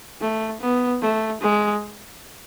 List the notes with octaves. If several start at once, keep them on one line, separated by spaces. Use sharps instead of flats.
A3
B3
A3
G#3